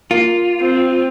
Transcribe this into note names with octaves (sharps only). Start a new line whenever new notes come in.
A#3 F4
C4